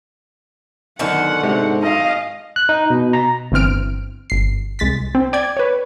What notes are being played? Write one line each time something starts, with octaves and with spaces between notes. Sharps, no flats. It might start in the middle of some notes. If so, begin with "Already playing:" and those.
F#2 B2 D3 D#3 C5 F#5
G#2 C3
G#1 D#5 F5
F#6
D#4
B2
A#5
G1 E3 C4 F6 D7
G1 C7
C2 G#3 A6 B6
C4
D5 G5 G#6
B4 C#5